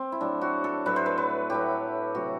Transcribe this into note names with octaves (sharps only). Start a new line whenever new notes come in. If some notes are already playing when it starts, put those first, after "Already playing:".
Already playing: C4
E4
A2 F#3 A3 D4
F#4
A4
A2 F#3 A3 B4
C5
B4
B4
A2 F#3 A3 G4
C3 F#3 A3 F#4